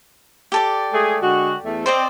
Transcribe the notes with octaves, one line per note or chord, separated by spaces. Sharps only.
G4 A4 D5
G#3 A3 G#4
D3 G#3 F#4
E2 A3
C4 C5 D5 D#5